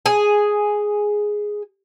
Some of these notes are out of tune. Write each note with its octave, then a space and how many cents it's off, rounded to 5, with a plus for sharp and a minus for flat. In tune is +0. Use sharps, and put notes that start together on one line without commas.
G#4 +0 G#5 +0